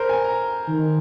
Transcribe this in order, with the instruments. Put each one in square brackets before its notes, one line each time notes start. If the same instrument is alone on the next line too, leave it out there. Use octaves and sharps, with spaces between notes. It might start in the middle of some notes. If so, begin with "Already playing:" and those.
Already playing: [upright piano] A#4 C5
G#5
A#5
[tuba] D#3